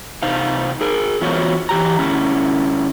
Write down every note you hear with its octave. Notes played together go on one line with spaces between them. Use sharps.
C3 D#4 C5 F5
G#4 A#4
E3 B3 F4 F#4 C5 C#5
E3 G4 A#5
D3 C#4 E4